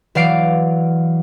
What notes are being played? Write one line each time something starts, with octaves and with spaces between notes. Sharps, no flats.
E3 F#3 D5 F5 C7 D7